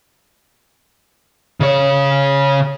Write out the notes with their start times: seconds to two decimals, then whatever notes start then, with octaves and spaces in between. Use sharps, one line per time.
1.60 C#3 C#5